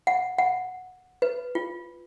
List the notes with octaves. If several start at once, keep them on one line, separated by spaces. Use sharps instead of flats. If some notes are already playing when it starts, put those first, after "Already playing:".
F#5
F#5
B4
F4